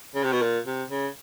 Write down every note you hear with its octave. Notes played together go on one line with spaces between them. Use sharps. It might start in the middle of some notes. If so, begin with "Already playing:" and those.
C#3
C3
B2
A#2
C3
C#3